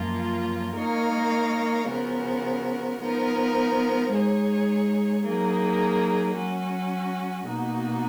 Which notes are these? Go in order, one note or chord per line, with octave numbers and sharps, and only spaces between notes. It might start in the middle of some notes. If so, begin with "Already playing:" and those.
Already playing: F#2 F3 A#3 F4
A#3 D#4 A#4 C#5 F5
C#3 F3 B3 F#4 A#4
F3 B3 D#4 A#4
G#3 D#4 G#4 C#5
F#3 A#3 D#4 G#4
F#3 C#4 F#4
B2 A#3 D#4 F#4